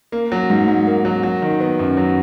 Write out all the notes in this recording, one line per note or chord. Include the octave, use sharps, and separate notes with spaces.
A#3
F#3
G#2
G#2
A#3
F#3
F#3
D#3
B3
F#2
F#3